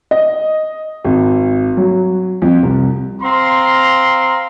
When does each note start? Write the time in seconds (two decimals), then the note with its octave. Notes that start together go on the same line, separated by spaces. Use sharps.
0.11 D#5
1.04 G#1
1.77 F#3
2.42 F2
2.63 C2
3.22 C4 F5 A#5 C6